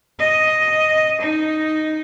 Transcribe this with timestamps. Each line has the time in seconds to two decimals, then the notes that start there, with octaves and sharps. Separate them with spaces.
0.20 D#5
1.21 D#4